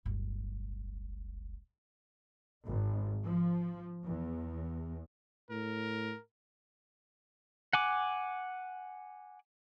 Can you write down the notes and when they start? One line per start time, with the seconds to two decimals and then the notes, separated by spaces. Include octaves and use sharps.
0.06 D1 G1
2.67 G#1
3.24 F3
4.05 E2
5.50 A2 A#4
7.73 F#5 G#5 D6